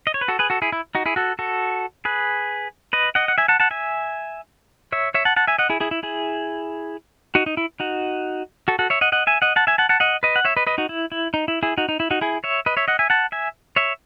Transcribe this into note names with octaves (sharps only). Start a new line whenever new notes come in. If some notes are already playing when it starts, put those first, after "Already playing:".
D#5
C#5
B4
F#4 A4
G#4 B4
F#4 A4
E4 G#4
E4
D#4 F#4
E4 G#4
F#4 A4
F#4 A4
G#4 B4
B4 D#5
D#5 F#5
F#5
E5 G#5
F#5 A5
F#5 A5
E5 G#5
C#5 E5
C#5 E5
F#5 A5
F#5 A5
E5 G#5
D#5 F#5
E4 G#4
E4 G#4
E4
E4 G#4
D#4 F#4
D#4
E4
D#4 F#4
F#4 A4
F#4 A4
C#5 E5
D#5 F#5
D#5 F#5
E5 G#5
D#5 F#5
F#5 A5
E5 G#5
F#5 A5
F#5 A5
D#5 F#5
B4 D#5
F#5
C#5 E5
B4 D#5
B4 D#5
D#4 F#4
E4
E4
D#4
E4
E4 G#4
D#4 F#4
D#4
E4
D#4 F#4
E4 G#4
C#5 E5
B4 D#5
C#5 E5
D#5 F#5
E5 G#5
F#5 A5
E5 G#5
C#5 E5